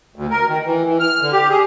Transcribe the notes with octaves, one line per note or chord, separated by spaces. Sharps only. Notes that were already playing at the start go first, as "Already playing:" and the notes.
D2
A#4
D#3
E3
E3
F6
D3
G4
G#4